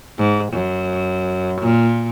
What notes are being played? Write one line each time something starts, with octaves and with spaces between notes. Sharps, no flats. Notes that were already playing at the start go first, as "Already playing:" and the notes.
G#2
F#2
A#2